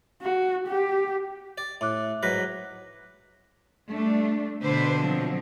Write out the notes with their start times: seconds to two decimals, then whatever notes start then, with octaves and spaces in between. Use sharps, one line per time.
0.22 F#4
0.68 G4
1.58 D5
1.81 A2 E5 D6 F#6
2.23 G#2 F#3 B4 F#6 A#6 B6
3.91 G3 A3 D4
4.62 B2 D3 D4 B4 C5
5.02 F3 F#3 C4